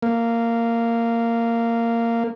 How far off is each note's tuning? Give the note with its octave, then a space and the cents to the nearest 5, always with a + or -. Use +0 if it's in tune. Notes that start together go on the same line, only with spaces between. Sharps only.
A#3 -10